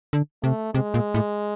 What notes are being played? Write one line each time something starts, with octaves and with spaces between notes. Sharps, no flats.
D3
C3 A3
C3 G#3
A#2
A2